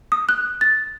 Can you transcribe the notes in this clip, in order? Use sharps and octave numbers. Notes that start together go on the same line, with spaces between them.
D#6
F#6
A6